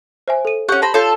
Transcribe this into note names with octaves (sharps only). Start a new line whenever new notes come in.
C5 E5 G#5
A4 D#7
C#4 G4 F#5 C#6 G6
C5 A5 B5 A#6
F4 A4 C#5 G6